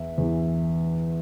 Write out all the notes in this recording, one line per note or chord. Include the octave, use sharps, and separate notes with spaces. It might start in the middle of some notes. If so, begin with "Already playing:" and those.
Already playing: E2 E3 E5
E2 E3